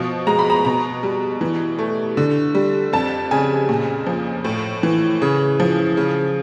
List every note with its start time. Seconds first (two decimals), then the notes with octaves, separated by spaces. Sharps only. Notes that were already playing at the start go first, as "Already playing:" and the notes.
Already playing: B2 F3
0.27 G#3 A#5
0.39 B5
0.50 A#5
0.65 B2 A#5
1.03 G3
1.41 E3
1.79 A3
2.17 D3
2.55 G3
2.93 F2 A5
3.31 C#3 G#5
3.69 A#2
4.06 F3
4.44 A2
4.83 E3
5.22 C#3
5.60 F3
5.97 C#3